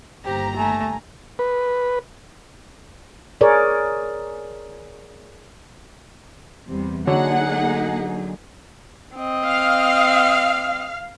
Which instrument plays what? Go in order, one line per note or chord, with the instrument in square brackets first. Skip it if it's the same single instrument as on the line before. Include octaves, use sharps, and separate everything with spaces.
[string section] G1 D#2 A#5 [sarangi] G4 [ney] C5
[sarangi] A3 [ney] G#5
[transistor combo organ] B4
[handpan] G#4 A#4 C#5 D5
[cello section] E2 C3 G3
[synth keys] D3 F#3 [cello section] A#3 D#4 G#4 [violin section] F#5
[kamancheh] C4 D#5
[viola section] F5